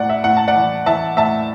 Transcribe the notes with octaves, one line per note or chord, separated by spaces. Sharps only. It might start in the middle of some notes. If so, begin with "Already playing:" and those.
Already playing: A2 D5 F#5
E5
A2 F#5
A5
D5 F#5
E3
E3 E5 A5
A2 E5 A5